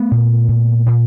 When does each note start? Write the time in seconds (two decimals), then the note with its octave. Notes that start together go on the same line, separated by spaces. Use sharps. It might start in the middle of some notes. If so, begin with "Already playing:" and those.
Already playing: A3 B3
0.11 A#2
0.49 A#2
0.86 A#2